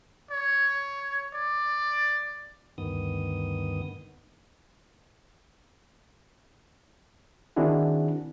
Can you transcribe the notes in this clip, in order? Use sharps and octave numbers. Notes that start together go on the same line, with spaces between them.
C#5
D5
D2 G2 D#3 B3 D#6
D#3 C4 D4 E4 F#4 G#4